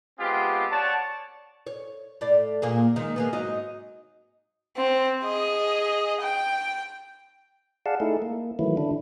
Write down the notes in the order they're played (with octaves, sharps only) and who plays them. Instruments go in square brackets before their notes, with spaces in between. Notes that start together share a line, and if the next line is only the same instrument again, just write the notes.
[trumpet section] G#3 B3 C4 F4 G4
C#5 D5 F#5 A5
[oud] C#5
A2 D5
A#2 A#3 G#4
D#3 G#3
G#3 A#3 B3
G#2 F#3 D#4
[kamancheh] C4
G#4 D#5
G5
[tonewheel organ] G#4 D5 F5 F#5 A5
A3 D#4 E4 G#4 A4
A#3
D#3 E3 F#3 A3 E4
D3 D4 E4